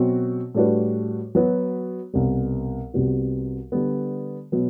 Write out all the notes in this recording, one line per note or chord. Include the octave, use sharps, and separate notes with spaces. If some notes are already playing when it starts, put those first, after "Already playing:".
Already playing: B2 F#3 C4 F#4
A2 G3 D4 F#4 B4
F#3 B3 F#4 B4
C2 B2 G3 B3
C2 C3 G3 B3 F#4
D3 G3 B3
B2 F#3 B3